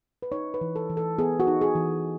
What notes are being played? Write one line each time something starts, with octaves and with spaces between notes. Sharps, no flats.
B4
D#4 C#5
B4
E3
A4
E3
A4
B3 G#4
F#4
D#4
G#4
E3